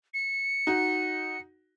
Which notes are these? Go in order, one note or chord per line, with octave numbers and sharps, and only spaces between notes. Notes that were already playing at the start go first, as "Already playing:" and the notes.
C#7
D#4 F#4